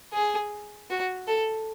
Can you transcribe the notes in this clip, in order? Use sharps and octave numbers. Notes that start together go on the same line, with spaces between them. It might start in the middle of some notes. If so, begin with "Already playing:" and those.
G#4
F#4
A4